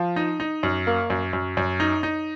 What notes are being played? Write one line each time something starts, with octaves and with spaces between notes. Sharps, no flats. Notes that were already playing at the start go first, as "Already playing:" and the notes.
Already playing: F3
D#4
D#4
F#2
A#3
F#2
F#2
F#2
D#4
D#4